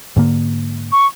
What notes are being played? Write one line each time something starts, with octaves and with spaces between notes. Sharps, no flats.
G#2 D3 A#3
C#6